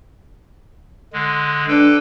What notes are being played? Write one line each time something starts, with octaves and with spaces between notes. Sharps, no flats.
D3 G#3
D4 A4 B4 G5